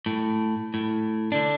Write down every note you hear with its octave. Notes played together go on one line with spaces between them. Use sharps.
A2
A2
D3 D4